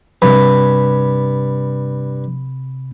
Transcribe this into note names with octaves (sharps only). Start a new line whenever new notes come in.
G2 C3 B5